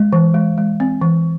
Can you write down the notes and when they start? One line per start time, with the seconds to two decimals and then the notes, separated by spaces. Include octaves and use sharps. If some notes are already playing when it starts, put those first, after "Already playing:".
Already playing: G#3
0.13 E3
0.34 G#3
0.58 G#3
0.80 C4
1.02 E3